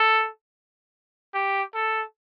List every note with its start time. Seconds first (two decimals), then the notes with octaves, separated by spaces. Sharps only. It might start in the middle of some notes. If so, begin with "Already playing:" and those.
Already playing: A4
1.34 G4
1.74 A4